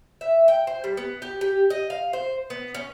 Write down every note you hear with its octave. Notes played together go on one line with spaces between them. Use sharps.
E5
G5
C5
G3
B3
G4
G4
D#5
F5
C5
B3
C#4